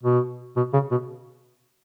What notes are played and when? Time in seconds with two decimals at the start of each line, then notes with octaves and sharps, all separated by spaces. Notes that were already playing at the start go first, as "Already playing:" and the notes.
0.03 B2
0.57 B2
0.73 C#3
0.91 B2